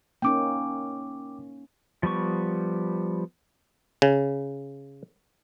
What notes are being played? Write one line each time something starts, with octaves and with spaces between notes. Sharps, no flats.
A#3 C#4 D#4 G5 D6
F3 G3 B3 C#6
C#3